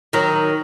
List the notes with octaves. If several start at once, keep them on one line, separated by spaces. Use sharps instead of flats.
D#3 F#3